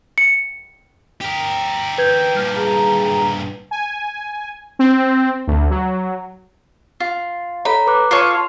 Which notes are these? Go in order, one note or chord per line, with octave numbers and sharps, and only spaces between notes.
C#7
G4 A#4
B4 G6 G#6
G2 A#2 F6
G#4 A#5
G#5
C4
D2
F#3
F4 C7
A4 C#5 A#5 B5
B4 D6 F#6
F4 A4 C#5 C7
C6 F6